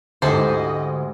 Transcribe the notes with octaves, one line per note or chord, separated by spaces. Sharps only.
D2 G#2 E4 G4 A4 C5 D#5